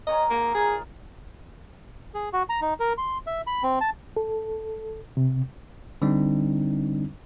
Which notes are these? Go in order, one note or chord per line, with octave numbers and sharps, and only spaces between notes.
A#4 C#5 D#5 G#5
G#2 A#3
D#4 F4 G#4 A#4
G#4
F#4
A#5
D#4
A#4
C6
E5
B5
C4
A5
A4
C3
D3 G3 C4 D4 D#4